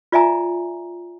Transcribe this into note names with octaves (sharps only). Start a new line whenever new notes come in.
F4 D5 E5 G#5 A#5